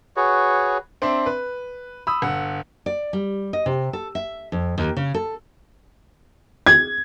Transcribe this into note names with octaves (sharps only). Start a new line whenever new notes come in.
F#4 G#4 B4 C#5
C4 D4 E5 C6
B4
B5 D#6 E6
G1 F#5
D5
G3
D#5
C3
A4
E5
F2
D#2
C#3
A4
G#6